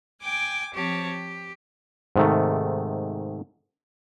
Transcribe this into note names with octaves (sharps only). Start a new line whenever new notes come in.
G5 G#5 D6
F3 C4 G4 C#5 A5
G4
G#2 C3 D#3 A3